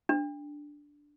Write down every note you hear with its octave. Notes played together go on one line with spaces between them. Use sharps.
D4